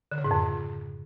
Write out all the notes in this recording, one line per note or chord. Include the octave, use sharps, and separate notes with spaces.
D3
C#3
G#2
F2